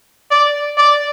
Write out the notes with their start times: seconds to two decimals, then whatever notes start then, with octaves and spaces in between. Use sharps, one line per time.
0.30 D5
0.78 D5